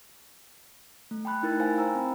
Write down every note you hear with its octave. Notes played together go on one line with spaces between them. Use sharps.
A3
G5 A5 B5 F#6
D#4 E4 A#4 A6
C5 F5 G#5 B5
C5 G5 A#5 E6
C4